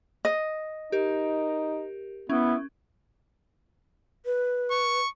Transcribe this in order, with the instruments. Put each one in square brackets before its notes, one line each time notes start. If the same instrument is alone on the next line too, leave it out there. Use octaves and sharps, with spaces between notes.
[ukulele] D#5
[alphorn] D#4 [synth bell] G4 A#4
[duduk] B3 [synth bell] C#4 [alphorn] E4
[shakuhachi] B4
[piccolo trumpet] C#6